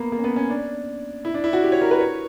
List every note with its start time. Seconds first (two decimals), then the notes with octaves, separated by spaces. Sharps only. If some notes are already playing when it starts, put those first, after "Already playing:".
Already playing: A#3 B3
0.12 A#3
0.18 C#4
0.24 B3
0.36 C#4
0.50 D4
1.25 E4
1.34 D4
1.44 E4
1.53 F#4
1.63 G4
1.72 C#5
1.81 A#4
1.91 B4
2.00 C#5